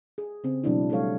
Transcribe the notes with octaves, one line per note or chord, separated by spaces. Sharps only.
G#4
C#3 C4
B2 E3 F#3 G#3 D4 E4
G3 A3 A4 C#5 F5